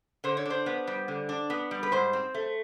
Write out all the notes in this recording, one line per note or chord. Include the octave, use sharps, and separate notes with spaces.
D3 C5
C#5
D4 C5
B3
G3
D3
D4
B3
G3
B4
G#2 C5
C4
A3